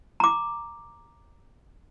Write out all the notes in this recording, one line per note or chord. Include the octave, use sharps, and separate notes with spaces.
A#5 D6